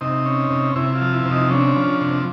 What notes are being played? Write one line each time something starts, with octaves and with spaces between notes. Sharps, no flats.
C3 D#4
C#4
C3
C3 E4
F4
F3
E4
C3
D#4
C#4 D4
F3
C3